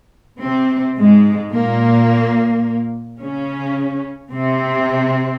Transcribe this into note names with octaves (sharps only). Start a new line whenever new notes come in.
C3 C4
G#2 G#3
A#2 A#3
C#3 C#4
C3 C4